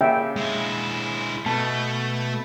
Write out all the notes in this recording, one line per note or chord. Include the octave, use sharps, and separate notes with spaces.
C#3 A#3 E5 G5
G#3 E4
B2 A3 A5